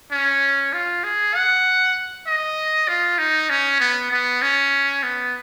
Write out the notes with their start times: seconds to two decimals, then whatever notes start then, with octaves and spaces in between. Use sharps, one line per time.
0.12 C#4
0.73 F4
1.04 G#4
1.35 F#5
2.27 D#5
2.88 F4
3.18 D#4
3.50 C#4
3.80 B3
4.11 B3
4.42 C#4
5.03 B3